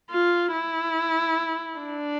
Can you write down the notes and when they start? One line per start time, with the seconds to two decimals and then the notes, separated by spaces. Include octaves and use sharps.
0.11 F4
0.53 E4
1.79 D4